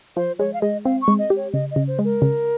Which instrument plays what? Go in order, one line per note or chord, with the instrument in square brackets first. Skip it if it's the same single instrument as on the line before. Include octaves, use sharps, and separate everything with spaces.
[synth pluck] F3 [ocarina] C5
[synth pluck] G#3 [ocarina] C#5
[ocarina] F5
[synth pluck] G#3 [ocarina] D#5
[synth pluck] C4 [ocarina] F5
[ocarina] C#6
[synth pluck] G#3
[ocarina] D#5
[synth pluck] G4
[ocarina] C#5
[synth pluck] C#3 [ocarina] D#5
[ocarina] D#5
[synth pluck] C#3
[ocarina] C5
[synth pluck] G#3
[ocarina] A#4
[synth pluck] C#3